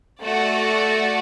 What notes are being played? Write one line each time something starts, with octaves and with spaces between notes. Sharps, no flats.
A3 F#4 D5